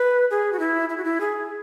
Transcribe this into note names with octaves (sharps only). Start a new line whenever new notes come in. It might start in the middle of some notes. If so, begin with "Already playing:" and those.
Already playing: B4
G#4
F#4
E4
E4
F#4
E4
G#4